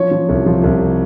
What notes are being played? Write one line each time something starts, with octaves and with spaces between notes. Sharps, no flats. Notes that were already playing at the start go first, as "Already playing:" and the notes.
Already playing: F3 C#5
F3
C2
F3
C2